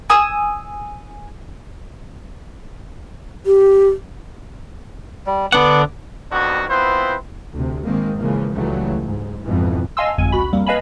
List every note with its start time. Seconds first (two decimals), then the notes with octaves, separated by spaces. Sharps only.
0.10 G#5 D#6 E6
3.46 G4
5.27 G3
5.52 D3 B3 D4 F#5 D6
6.31 F2 D#3 B3 D4 F#4
6.69 B3 C4 E4 F4 B4 C5
7.52 D2 C3
7.85 G#2 D#3 G#3 A#3 C4
8.18 C#3 E3 F3 G#3 A#3
8.53 C#2 C#3 E3 F#3 G3 A3
9.04 G#2
9.43 F2 G#2 B2 E3
9.97 D#5 F5 G#5 A5 C6 E6
10.18 G1 F2 G#3 G#5
10.32 C#2 F#4 B5
10.53 F2 G3 A#3
10.67 B4 D#5 F5 G#5 A5 B5